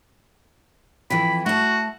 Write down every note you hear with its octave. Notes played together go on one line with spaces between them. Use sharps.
F2 E3 B5
A3 F#4 A5